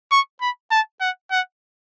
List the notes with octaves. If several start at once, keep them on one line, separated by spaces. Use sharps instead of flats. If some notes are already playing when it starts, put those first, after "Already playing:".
C#6
B5
A5
F#5
F#5